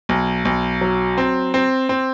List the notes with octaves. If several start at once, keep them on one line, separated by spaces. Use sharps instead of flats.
B1
B1
F#3
C4
C4
C4